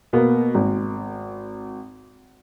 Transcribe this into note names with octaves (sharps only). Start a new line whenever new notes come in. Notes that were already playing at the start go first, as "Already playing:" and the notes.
B2 A#3 B3
G#1